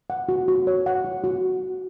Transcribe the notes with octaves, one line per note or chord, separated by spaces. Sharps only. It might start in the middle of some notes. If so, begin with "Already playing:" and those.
F#5
F#4
F#4
C#5
F#5
F#4
F#4